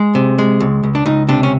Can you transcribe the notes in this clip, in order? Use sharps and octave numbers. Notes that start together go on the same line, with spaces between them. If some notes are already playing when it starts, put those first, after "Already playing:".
Already playing: G#3 G#4
C3
G#3
C#2
C#2
D4
C#2 D#4
C3 D4
C#4